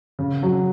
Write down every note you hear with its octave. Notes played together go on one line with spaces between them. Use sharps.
C#3
F#3